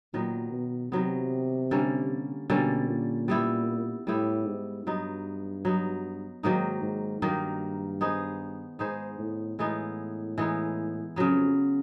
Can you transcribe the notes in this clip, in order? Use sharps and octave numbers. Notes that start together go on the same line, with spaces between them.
A#2 D#3 F#3 B3
B2
C3 D#3 F#3 B3
D3 G3 A#3 C#4
B2 D3 G3 A#3 C#4
A#2
G3 B3 E4 G4
A2 G3 B3 E4 G4
G#2
G2 F#3 B3 D#4
F#3 B3 D#4
G#2 D#3 F#3 A#3 D#4
G#2
G2 D#3 F#3 A#3 D#4
B3 D#4 G#4 C5
G#2 B3 D#4 G#4 C5
A2
A2 E3 G#3 B3 D#4
E3 G#3 B3 D#4
F2 C#3 F#3 B3